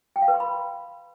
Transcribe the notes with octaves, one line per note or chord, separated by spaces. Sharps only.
G5
F5
B4
C6
B5